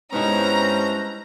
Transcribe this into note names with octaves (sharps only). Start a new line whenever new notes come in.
G2 G#3 B3 C#4 D#4 E4 C5 A#5